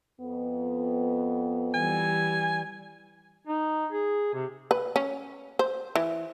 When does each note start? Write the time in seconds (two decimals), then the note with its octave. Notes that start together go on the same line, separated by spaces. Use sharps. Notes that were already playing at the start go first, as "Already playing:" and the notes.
0.21 F2 B3
1.74 E3 G3 G#5
3.47 D#4
3.92 G#4
4.34 C3
4.71 B4
4.96 C#4
5.59 C5
5.96 E3